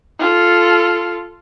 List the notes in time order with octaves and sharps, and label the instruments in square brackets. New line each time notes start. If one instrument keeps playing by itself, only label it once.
[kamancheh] F4 A4